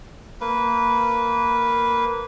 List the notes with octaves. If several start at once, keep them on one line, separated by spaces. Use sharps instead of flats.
A#3 B4